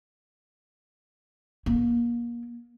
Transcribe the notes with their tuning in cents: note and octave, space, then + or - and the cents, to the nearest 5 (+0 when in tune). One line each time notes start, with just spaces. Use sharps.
A#3 +30